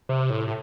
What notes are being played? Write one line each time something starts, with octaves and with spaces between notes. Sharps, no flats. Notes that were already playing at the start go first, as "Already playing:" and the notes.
C3
A2
A2